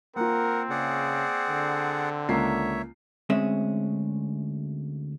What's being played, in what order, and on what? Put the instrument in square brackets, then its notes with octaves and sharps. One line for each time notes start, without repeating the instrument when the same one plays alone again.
[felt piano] A#3 F4 [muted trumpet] C4 [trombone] A#4 [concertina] F#5
[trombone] C#3 [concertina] G#4 D5 F#5
[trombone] D3
[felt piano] C#2 A#3 C7 [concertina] C#5 E5
[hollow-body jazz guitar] D2 G#3 C4 C#4 G#4 E5